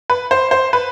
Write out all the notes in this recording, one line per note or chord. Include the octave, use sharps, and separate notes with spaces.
B4
C5
C5
B4